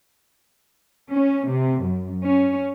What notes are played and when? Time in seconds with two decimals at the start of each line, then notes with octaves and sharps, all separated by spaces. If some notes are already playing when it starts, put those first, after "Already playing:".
1.12 C#4
1.48 C3
1.82 F#2
2.24 C#4